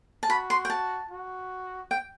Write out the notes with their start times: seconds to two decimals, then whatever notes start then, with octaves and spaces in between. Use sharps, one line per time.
0.23 A5
0.30 F#4 B5
0.50 C6
0.65 G5
0.70 A5
1.11 F#4
1.91 G5